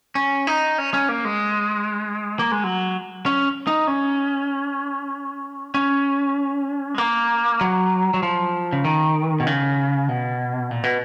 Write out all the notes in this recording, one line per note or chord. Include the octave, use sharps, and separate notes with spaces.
C#4
D#4
C#4
C#4
A#3
G#3
A#3
G#3
F#3
C#4
D#4
C#4
C#4
G#3
A#3
F#3
F#3
F3
C#3
D#3
B2
C#3
B2
A#2
B2